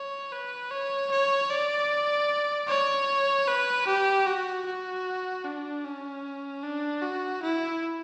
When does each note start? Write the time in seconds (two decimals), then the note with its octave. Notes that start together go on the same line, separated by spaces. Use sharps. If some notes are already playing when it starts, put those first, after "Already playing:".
Already playing: C#5
0.32 B4
0.71 C#5
1.11 C#5
1.51 D5
2.68 C#5
3.48 B4
3.87 G4
4.26 F#4
4.66 F#4
5.45 D4
5.85 C#4
6.63 D4
7.02 F#4
7.42 E4